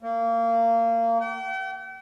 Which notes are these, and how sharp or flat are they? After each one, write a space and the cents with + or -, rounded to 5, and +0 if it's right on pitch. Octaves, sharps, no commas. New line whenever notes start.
A#3 -25
G5 -45